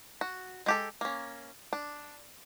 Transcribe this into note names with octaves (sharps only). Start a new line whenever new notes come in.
F#4
G#3 G4 A4
A#3 C#4
D4